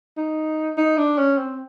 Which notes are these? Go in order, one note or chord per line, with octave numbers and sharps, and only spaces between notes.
D#4
D#4
D4
C#4
C4